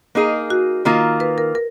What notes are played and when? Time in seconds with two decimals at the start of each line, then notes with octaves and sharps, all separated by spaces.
0.15 A#3 D#4 G#4
0.50 F#4
0.85 D#3 A#3 F4
1.20 B4
1.38 A#4
1.55 A#4